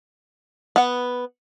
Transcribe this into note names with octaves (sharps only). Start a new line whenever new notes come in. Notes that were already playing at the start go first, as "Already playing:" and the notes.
B3 F#5